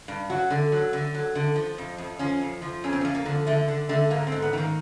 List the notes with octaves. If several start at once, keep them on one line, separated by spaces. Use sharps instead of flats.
G2
F#3 F#4
D3
F#3
D3
F#3
D3
F3
F2
F2
F3 C#4
F2
F3
F2 C#4
C4
C#4
F3
A#3
D3
D3 A3
D3
D3 A3
G#2 A#3
C4
G#2
B3
D#3 A#3